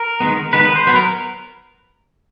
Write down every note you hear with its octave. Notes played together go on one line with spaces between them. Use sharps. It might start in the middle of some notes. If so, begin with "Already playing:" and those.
Already playing: A#4
D#3 G#3 B3
D#3 G#3 B3 B4
B4
C5
F#3 B3 B4
A#4